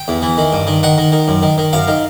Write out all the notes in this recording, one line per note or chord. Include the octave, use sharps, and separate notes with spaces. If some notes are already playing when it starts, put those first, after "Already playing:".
Already playing: G5
E2
E3
D#3
G2
D#3
D#3 F#5
D#3
D#3
F#2
D#3
D#3
F#2 F5
D#3